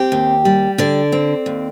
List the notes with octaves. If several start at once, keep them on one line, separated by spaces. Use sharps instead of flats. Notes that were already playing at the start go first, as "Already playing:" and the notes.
Already playing: C4 G4
D#2
G3
D3 D5
C4
D#2